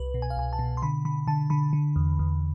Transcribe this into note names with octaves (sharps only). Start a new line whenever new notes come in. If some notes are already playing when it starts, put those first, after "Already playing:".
Already playing: C2 B4
B2
G#5
F5
C2 G#5
A5
B2
C6
D3 B5
D3 B5
D3 A5
D3 B5
D3
E2
E2